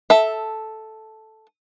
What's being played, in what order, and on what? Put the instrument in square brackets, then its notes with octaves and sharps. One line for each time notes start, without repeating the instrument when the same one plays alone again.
[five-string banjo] A4 E5